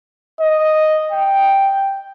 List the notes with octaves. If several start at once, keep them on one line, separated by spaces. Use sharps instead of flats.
D#5
G5